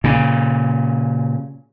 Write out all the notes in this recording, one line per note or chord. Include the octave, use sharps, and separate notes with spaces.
A#2 C#3